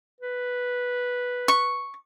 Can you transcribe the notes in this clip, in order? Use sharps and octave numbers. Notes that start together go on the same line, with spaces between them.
B4
C#6